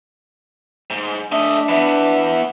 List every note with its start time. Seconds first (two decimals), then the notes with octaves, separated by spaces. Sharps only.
0.90 G#2
1.32 A3 D4 D#5 E5
1.69 E3 B3 E5